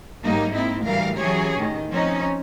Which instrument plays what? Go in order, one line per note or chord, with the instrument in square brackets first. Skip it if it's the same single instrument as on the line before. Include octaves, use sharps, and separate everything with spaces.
[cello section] G#2 F#3 G3 A#3 D#4
A#3 C4 D#4 E4
D2 A2 E3 G3 A#4 F5
E3 F#3 C#4 G4 G#4 C#5
A2 D#3
F3 C4 C#4 D#4